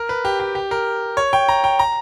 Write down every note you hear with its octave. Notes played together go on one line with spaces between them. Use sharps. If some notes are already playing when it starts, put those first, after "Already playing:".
Already playing: A#4
B4
G4
G4
G4
A#4
C#5
G5
A#5
G5
A#5